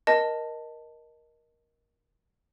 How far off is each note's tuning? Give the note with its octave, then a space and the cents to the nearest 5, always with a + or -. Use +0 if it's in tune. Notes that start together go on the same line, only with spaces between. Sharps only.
A#4 +15 D#5 +0 A5 +10